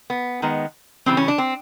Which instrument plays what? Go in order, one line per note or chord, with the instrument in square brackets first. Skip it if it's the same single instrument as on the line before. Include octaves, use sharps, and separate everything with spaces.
[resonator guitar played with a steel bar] B3
D#3 G#3 B3
C#3 E3 G3 A#3 C4
C#4
D4
C4